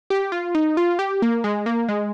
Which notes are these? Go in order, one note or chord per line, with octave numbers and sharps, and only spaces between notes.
G4
F4
D#4
F4
G4
A#3
G#3
A#3
G#3